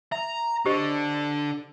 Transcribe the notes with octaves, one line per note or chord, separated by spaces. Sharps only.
E5 A#5
D3 G4 C5 D#5